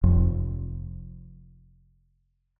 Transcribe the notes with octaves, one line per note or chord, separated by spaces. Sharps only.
F1 F2